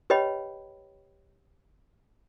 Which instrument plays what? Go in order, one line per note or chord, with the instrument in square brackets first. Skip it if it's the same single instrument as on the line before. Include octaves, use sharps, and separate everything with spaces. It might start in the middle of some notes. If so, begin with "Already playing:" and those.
[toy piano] G4 B4 C#5 D#5 G5 B5